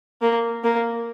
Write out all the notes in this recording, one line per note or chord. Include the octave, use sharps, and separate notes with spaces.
A#3
A#3